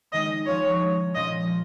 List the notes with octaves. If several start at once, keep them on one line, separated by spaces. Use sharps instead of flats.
D#3 G#3 D#4 G#4 D#5
F3 C#4 F4 G#4 C#5
G#3 D#4 G#4
A#2 F3 C#4 F4 D#5
F3